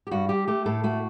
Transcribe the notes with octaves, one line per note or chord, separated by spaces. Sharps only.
G4
G2 F#4
G3 G4
A3 G4
A2 A4
A3 F#4